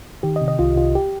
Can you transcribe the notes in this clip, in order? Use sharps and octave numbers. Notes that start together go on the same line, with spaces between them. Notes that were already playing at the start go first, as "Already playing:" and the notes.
D#3 G4
D#5
C3
D#5
C2 F4
C2 F4
G4